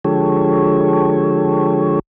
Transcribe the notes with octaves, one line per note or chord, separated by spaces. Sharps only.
D3 F3 G#3 G4 A4 C#5